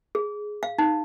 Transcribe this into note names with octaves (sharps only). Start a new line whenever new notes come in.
G#4
F5
D#4